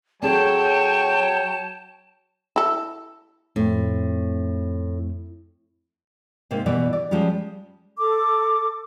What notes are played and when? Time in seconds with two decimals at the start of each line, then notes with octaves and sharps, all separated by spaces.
0.22 F#3 C4 G#4 A4 C#5 G5 A5
2.56 E4 A4
3.56 F2 A2 A3 C4
6.51 G#2 C3 A#3
6.66 B2 E3 G3 D5
6.93 D5
7.11 F3 G3 G#3 C#4 F4
7.98 A4 D6